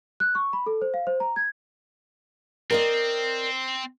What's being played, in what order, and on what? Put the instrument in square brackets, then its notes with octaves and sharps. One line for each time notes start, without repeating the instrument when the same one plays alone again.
[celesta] F#6
C#6
B5
A4
C5
F5
C5
A#5
G#6
[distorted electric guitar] C4 [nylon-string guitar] A#4 D5 D#5